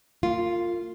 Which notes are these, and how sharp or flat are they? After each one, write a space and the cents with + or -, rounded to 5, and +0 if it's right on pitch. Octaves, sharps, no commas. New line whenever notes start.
A#3 -35 F4 +0